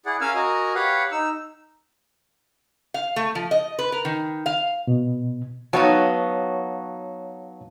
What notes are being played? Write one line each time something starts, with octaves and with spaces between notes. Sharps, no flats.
E4 G#4 D5 F#5
C#4 A#4 F5 G#5 E6 F6
F#4 A#4 D#5 G#5 A#5
G4 B4 C#5 F5 F#5
D#4 E6
F5
A3
F3
D#5
B4
A#4
D#3
F5
B2
F#3 B3 D#4 C#5 F5 A5